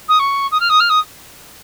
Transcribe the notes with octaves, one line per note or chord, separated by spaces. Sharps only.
D#6
C#6
D#6
F6
D#6
F6
D#6